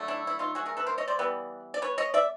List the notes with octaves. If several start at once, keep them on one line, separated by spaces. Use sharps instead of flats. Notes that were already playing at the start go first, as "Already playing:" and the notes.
Already playing: D3 F#3 A3
D4 E4
E4
D#4 F4
F#4 G#4
G#4 A#4
A4 B4
A#4 C5
C#5 D#5
C5 D5
E3 G3 B3
D5
B4 C#5
C#5 D#5
D5 E5